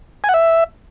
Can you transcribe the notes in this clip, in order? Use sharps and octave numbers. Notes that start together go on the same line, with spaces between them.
G#5
F#5
E5